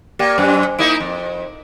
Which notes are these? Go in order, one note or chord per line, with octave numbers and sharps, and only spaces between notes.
A#3 G4 D5 G5
F#2 C5 G#5
A#3 D#4 E4 D7
F2